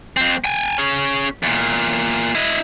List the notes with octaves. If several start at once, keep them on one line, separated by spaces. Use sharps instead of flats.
F2 C4
G5 G#5
C#4 G#4
E2 A#2
E4 D#5